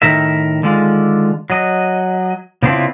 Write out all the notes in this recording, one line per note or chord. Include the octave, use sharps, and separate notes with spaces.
A2 D#3 A#4 E5
D3 D#3 G#3 F4
F#3 D#5
C#3 B3 C4 D4 E4 F4